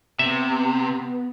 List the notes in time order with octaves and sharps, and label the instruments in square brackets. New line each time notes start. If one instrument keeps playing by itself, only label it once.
[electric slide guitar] C3 [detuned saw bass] B3 [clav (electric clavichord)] E5